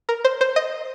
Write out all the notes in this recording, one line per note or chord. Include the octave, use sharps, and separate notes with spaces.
A#4
C5
C5
D#5